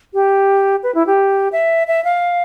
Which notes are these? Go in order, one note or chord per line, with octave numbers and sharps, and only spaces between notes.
G4
B4
E4
G4
E5
E5
F5